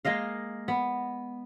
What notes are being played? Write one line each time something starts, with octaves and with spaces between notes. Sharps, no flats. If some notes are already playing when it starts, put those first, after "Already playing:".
G#3 A#3 D#5 F5
B3